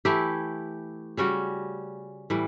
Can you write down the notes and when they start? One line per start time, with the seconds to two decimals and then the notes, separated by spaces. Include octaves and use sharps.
0.05 E3 A3 E4 G4
1.17 C#3 G3 C#4 F#4
2.30 A2 E3 G3